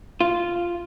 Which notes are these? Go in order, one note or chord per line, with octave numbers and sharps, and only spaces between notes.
F4